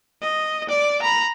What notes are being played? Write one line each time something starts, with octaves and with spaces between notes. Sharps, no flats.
D#5
D5
A#5 B5